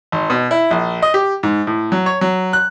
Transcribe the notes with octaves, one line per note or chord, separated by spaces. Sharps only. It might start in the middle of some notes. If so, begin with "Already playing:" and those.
G#1
B2
E4
A#1
D#5
G4
G#2
A2
F#3
C#5
F#3
F#6